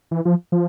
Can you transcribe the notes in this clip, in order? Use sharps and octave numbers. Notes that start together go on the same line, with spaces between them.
E3
F3
F3